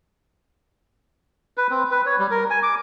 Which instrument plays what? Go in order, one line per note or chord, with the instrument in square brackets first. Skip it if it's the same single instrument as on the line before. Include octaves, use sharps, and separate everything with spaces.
[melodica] B4
C4
B4
C#5
G3
A#4
G#5
D6